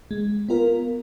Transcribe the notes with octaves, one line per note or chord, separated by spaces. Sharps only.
G#3
B3 F4 A#4